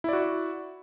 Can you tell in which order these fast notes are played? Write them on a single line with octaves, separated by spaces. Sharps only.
E4 D5 F#4